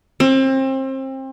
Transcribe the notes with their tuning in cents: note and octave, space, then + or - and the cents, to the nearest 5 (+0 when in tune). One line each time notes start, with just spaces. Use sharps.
C4 +30